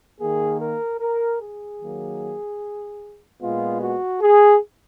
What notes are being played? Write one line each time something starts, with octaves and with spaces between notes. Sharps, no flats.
D#3 A#3 G#4
A#4
A#4
G#4
D#3 F#3 A#3
A#2 G#3 B3 F4
F#4
G#4